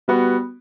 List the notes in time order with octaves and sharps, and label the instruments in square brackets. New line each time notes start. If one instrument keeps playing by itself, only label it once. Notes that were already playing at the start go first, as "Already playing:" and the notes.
[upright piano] G3 B3 F#4